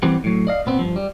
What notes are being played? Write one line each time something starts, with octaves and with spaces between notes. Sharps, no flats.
E3 G3 B3 C4 G4 B4
A2 F#3
D5 D#5 F5
A#2 B3 C4
G2 F3
G3